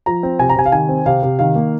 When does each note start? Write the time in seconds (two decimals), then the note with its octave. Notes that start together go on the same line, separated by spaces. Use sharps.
0.06 F3 A#5
0.23 C4
0.39 C3 G#5
0.50 A#5
0.56 C3 G#5
0.66 F5
0.72 D#3 G#5
0.89 C4
1.06 C3 F5
1.23 C3
1.39 D#3 F5
1.55 A#3